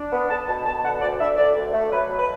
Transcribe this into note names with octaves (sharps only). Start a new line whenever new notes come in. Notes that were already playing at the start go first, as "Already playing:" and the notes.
Already playing: D4
B3
B3 A5
B2 A5
B2 A5
D3 F#5
D2 D5
D4 E5
D3 D5
D2
A3
F#3 B4
B2
B4